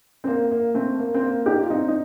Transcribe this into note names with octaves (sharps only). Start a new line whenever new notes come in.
C4
A#3
A#3
A3 C4
A#3
C4
A#3
D#4 G4
F4
C4 D#4
D#4